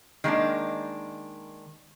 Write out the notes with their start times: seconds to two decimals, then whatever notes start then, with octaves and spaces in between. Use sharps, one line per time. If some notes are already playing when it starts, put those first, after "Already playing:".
0.24 D#3 G#3 A#3 D4